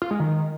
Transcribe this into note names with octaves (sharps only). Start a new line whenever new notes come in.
F4
G#3
D#3